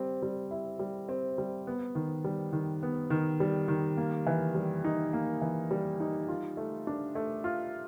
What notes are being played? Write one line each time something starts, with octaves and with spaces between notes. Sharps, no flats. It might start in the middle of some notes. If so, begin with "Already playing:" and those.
Already playing: G3 C4
G3
E4
G3
C4
G3
B3
D#3
G3
D#3
B3
D#3
G3
D#3
A#3
E3
G3
D#4
A#3
E3
G3
D#4
F4
A3
D4
A3
F4